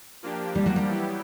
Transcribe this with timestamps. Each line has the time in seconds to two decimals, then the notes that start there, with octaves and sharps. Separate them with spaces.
0.23 F3 A#3 D4 G4
0.55 G3
0.66 F#3
0.76 G3
0.88 F#3 B3 E4 G4